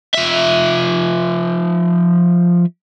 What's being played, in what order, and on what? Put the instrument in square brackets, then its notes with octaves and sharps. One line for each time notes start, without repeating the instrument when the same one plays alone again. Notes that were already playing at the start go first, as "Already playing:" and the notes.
[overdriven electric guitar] F3 E5